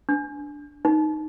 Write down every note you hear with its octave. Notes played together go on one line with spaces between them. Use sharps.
D4
D#4